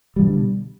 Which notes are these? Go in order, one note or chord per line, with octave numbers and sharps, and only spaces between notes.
B2 D3 F3 G3